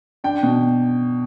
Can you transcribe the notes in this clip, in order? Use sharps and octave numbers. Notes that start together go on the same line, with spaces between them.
D4 G5
B2